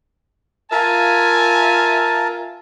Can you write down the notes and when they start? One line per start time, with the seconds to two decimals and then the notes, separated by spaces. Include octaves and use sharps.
0.72 F4 A#4 E5 G#5 A5